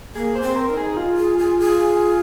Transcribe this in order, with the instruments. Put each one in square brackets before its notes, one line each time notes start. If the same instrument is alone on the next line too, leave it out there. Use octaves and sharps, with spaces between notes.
[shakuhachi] A#3 [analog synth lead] G#4
[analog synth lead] C5
[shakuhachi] C4
[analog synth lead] A#4
[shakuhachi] D#4
[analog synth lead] G#4
F4
[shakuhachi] G#4
G#4
G#4